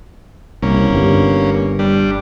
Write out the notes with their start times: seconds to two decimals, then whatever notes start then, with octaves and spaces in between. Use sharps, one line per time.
0.63 C2 C3 A#3 C#4
0.91 G1 G2
1.79 G3 D4